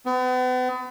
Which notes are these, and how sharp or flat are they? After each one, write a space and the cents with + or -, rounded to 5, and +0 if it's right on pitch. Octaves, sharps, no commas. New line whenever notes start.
B3 +40